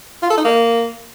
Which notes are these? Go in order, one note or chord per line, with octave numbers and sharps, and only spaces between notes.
F4
A4
D#4
A#3